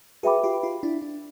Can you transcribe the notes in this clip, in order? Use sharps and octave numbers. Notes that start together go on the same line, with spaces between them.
F#4 G#4 B4 E5 G5 B5 D6
F4 G4
F4 G4
D4 E4
D4